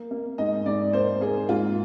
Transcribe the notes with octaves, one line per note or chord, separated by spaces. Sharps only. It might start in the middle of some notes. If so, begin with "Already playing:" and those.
Already playing: A#3
A#3
G#2 D#5
G#2 D5
A#3 C5
A#3 G#4
G#2 F4